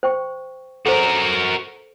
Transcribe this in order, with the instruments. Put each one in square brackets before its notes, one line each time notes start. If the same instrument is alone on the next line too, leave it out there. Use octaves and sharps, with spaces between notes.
[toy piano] C5 G5 C#6
[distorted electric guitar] F#4 A#4 [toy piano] A4 C5